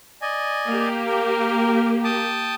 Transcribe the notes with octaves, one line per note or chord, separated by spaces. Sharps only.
D5 D#5 G#5
A#3 G4
A#4
G5 A5 D#6